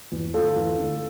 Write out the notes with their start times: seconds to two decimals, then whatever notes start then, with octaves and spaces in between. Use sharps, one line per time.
0.12 E2
0.34 D3 A3 F4 A4
0.56 E2
0.78 D3 A3